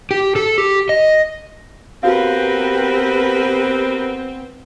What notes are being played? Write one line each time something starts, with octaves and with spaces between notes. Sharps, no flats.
G4
A4
G4
D#5
B3 C4 F#4 G4 A#4 B4 F5